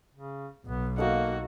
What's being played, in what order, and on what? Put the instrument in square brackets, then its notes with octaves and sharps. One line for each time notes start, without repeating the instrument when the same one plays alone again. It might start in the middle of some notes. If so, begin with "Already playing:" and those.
[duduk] C#3
[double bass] B1 [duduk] B3
[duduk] A#3 [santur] D#4 A4 F5 [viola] F#4